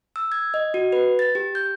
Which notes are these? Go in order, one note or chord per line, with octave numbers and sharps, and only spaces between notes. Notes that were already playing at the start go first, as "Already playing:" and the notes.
E6
G#6
D#5
F#4
B4
A6
G4
G6